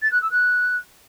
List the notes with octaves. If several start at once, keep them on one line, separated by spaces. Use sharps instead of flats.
A6
F#6
E6
F#6